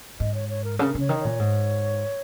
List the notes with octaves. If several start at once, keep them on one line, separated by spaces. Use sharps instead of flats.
G#2 D#5
C#5
C#5
A#4
C#3 A#4
C#3 C#5
D#3
C#5
A#2
G#2